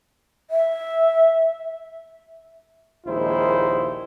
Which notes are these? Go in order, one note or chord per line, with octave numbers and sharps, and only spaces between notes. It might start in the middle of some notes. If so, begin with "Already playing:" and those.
E5
A#1 D#2 G#3 D#4 E4 C5